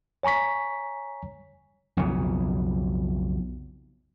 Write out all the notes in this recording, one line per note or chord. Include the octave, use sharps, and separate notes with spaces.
C#5 G#5 A#5 C#6 B6
B1 F2 C#3